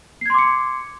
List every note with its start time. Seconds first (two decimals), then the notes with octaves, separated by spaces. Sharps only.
0.21 C7
0.26 G#6
0.30 C6
0.34 D6
0.38 C#7